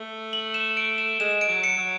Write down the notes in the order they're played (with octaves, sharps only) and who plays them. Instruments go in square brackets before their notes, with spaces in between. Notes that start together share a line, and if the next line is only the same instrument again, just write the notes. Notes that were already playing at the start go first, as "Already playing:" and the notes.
Already playing: [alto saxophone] A3
[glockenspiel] F#7
E7
D7
E7
[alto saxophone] G#3 [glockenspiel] E7
[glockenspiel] D7
[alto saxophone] F#3
[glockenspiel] C#7
[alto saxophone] F#3